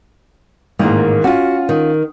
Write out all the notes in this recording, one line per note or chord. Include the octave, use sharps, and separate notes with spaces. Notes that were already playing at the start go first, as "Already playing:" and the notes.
A1 G#2 D#3 A#3
C#4 F4 F#4
D#3